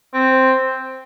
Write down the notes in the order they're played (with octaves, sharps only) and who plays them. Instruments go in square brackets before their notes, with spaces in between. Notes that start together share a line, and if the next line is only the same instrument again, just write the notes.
[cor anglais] C4